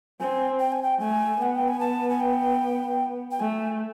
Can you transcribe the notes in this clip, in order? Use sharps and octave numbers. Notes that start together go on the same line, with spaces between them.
C4 G#5
G5
G#5
G5
A3 G#5
B3 F#5
G5
G#5
A5
G#5
G5
G5
A3 G#5